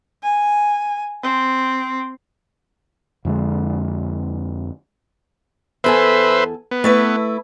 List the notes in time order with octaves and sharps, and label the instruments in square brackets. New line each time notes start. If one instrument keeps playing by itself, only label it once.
[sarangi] G#5
C4
[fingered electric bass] F2 D3 G#3
[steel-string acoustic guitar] E2 A4 G#5 [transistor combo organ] B4 C5 E5
[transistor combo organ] B3
[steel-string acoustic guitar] A3 E4 B4